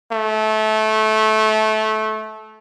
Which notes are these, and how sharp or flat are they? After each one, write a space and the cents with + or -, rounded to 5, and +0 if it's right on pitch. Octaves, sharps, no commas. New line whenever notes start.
A3 -20